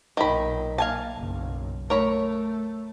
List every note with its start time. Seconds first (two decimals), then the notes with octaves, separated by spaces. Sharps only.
0.17 B1 A#2 D#3 B5
0.78 A#3 F5 G#5 A5
1.17 F#1 B1
1.90 A3 A#4 C#5 B5